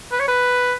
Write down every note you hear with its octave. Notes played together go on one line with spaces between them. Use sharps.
B4
C#5
B4